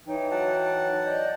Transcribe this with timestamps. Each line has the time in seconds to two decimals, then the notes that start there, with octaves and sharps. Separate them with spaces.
0.06 E3 D#4 C#5 G5
0.31 F#3 F#5 A5
1.05 D5 D#5 G6